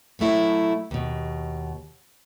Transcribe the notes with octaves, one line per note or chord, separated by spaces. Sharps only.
B2 F#3 A3 E4
D#2 B2